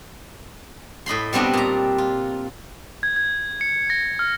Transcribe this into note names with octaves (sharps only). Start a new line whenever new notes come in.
A2 D#5 B5 C6
B2 G3 B3 C4 D4 D#5
A#2 A#5
F4
G#6
G#6
C#7
A#6
F6